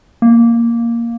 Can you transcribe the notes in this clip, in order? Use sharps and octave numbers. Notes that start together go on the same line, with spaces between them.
A#3